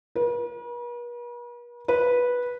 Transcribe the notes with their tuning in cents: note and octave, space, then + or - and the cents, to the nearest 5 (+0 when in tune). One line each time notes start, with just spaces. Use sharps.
B4 -45
B4 -10